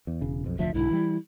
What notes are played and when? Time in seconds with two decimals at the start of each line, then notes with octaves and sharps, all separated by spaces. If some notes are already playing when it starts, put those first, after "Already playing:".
0.07 E2
0.21 E1 C#3
0.45 B1 F2
0.59 F1 D2 F3 E5
0.74 B1 G#2 D3 E4
0.91 E3 G3